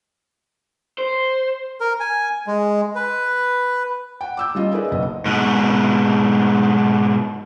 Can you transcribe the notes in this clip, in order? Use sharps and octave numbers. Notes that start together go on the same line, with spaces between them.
C5
A#4
G#5
G#3
B4
F#5 G5
D6 E6 G6
G3 C#4 F4 D#5
D#4 G#4 A#4 B4 D5 E5
F#1 B1 D#5
G#2 B2